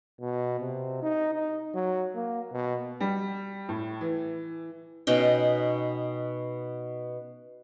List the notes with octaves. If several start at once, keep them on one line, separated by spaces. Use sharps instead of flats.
B2
C3
D#4
D#4
F#3
A#3
B2
G3
A2
E3
B2 C#4 D#4 G5